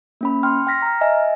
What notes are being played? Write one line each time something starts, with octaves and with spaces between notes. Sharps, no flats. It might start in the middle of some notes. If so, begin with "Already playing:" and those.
A#3 C#4 B5
G5 C6 F6
G5 F6 A#6 B6
A#5 F6
D#5 E5 G#5